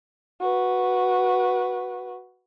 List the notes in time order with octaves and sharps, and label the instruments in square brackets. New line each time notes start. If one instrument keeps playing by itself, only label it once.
[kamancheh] F#4 B4